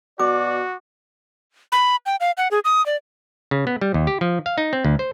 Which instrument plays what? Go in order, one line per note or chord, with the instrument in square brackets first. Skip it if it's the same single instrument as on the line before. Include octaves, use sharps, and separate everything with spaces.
[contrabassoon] B2 [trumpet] F#4 [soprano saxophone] D5 [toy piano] D6
[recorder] B5
G5
F5
F#5
G#4
D#6
D5
[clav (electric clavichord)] C#3
B3
G3
D#2
G4
F3
F5
D#4
C4
D2
C5